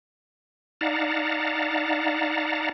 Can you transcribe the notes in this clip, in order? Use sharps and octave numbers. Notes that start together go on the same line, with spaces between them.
D#4 D5 F5 F#5 A5 A#5